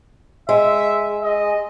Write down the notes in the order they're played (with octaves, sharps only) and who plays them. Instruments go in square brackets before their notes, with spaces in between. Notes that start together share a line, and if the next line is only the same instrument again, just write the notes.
[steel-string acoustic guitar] G#3 [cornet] E5
[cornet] D#5